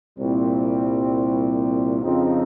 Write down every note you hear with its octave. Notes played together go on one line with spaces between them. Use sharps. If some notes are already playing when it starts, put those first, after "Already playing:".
C2 A#2 G3 C4
F2 C#3 F3 C4 D#4